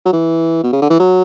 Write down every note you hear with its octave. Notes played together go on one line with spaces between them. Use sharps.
F#3
E3
B2
C#3
D3
E3
F#3